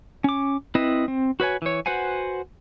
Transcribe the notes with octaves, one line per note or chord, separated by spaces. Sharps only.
C#4 D6
C4 E4 B4 D#5
C4
F#4 B4 C#5 G#5
E3 C#5
F#4 B4 C5 F#5 G#5